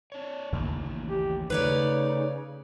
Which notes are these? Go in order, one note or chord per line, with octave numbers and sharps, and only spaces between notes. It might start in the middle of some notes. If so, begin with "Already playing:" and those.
D4 C#5
A1 D#2 C#3 E3 A#3
G4
C#3 A3 D#4 B4 C#5 D5